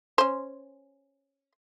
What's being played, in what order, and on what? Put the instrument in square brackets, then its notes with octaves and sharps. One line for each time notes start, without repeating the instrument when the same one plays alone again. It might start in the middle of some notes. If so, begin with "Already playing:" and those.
[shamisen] C#4 C5